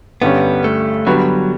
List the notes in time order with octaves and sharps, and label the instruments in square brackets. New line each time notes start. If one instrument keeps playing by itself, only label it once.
[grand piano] G2 D3 G3 C#4 [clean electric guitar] B3
[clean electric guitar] A3
[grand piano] D3 G3 B3 F#4 [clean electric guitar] F#3